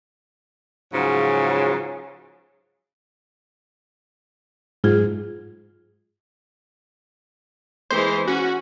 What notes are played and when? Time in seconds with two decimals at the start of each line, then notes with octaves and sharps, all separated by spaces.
0.93 G#2 C#3 F3 F#3
4.84 G#2 F#3 F4 G#4
7.90 E3 G#3 C5
8.27 C#4 F#4